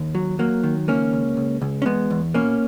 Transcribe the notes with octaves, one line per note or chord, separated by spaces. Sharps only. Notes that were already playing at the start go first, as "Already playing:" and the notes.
Already playing: D#2
F#3
F#3 A#3
D#3
C#2 A#3 C#4
C#2
C#2
C#2
C#4
E2 G#3 B3
E2
B2 A#3 C#4